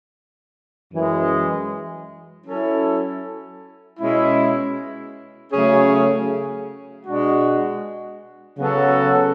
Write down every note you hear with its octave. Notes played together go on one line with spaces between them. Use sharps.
F#2 E3 G#3
F#3 C#4 E4 A4
B2 G#3 C#4 E4
C#3 F#3 A3 C#4 G#4
B2 G#3 D4 F#4
C#3 F#3 B3 F#4 A4